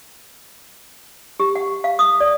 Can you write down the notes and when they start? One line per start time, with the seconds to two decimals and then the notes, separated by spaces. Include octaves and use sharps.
1.40 G4
1.56 F#5
1.84 F5
1.99 D#6
2.20 D5